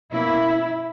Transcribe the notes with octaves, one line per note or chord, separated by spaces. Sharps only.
B2 A#3 C#4 E4